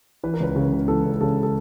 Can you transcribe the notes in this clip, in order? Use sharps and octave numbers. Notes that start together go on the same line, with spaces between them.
E3 B4
A#4
C#2 B4
C#3
C#2
E3 A4
C#2
C#3 A4
A4